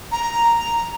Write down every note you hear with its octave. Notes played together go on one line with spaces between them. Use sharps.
A#5